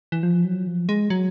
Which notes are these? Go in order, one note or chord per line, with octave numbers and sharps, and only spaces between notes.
E3
F3
F#3
F3
G#3
F#3